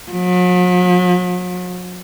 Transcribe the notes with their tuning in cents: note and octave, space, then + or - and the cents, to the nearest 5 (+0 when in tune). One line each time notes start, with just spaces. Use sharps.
F#3 -45